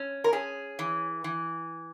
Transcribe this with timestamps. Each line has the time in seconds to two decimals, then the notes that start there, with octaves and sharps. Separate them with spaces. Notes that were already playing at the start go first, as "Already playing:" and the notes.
Already playing: C#4
0.24 A#4
0.32 C#4 G#4
0.79 E3
1.24 E3